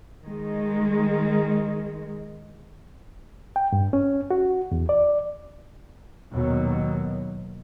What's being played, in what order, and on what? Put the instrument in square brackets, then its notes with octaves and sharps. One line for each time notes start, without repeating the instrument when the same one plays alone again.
[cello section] D#3 G#3
[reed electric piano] G5
G2
C#4
F#4
E2
D5
[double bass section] D#2 B2 F#3